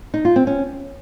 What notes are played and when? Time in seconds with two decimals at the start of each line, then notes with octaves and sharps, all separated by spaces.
0.14 D#4
0.25 F4
0.36 C4
0.47 C#4